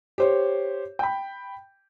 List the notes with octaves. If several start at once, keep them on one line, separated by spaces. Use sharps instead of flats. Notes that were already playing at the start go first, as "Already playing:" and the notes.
G4 C5 C#5
G5 B5